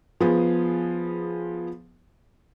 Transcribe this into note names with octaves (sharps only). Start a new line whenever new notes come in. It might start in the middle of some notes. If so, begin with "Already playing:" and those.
F3 B3 F4 G#4